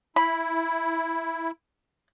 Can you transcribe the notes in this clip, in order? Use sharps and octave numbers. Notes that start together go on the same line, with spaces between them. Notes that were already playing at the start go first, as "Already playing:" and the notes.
E4 B5